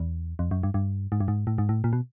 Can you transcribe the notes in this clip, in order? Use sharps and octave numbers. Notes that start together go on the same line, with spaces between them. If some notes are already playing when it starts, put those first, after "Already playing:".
Already playing: E2
F2
F#2
G2
G2
G#2
G2
G#2
A2
G#2
A2
A#2
B2